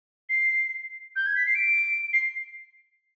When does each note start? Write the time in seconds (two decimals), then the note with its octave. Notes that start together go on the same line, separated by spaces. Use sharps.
0.29 C7
1.16 G6
1.26 G#6
1.36 B6
1.46 C7
1.55 D7
2.13 C7